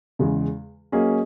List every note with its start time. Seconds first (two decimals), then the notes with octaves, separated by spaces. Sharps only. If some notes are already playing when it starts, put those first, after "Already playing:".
0.19 E2 C#3 G#3
0.92 F#3 A#3 C#4 G#4 D#5